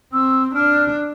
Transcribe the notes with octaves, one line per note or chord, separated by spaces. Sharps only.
C4 E6
D4 F6